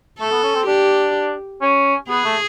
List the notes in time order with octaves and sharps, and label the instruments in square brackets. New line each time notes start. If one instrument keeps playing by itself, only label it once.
[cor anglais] A3 [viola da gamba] A4
[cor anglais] B3
C#4
C4
[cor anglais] D4 [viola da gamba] G4
[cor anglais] C#4
[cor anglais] B3 [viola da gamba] G#4
[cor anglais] A3